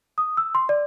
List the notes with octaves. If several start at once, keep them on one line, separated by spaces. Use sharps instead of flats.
D#6
E6
C6
D5